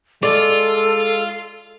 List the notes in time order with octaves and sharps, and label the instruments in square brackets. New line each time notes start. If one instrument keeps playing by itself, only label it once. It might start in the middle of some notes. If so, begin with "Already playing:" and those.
[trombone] G#3 [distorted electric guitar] F4 [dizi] A4 [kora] D5